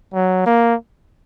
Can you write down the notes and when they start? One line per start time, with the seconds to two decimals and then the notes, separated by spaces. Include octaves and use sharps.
0.14 F#3
0.46 A#3